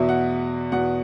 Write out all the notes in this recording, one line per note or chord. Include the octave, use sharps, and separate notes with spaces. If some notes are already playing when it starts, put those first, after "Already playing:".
Already playing: E2 B2 E5
F#5
E2 B2 F#5